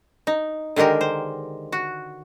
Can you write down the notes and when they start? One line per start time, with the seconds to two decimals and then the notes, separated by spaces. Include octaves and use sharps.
0.27 D#4
0.76 D3 D#3 G#3 G4 A#4
1.01 C5
1.72 F#4